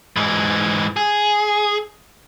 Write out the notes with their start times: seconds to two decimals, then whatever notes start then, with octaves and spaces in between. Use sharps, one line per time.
0.16 G#2 E3
0.97 G#4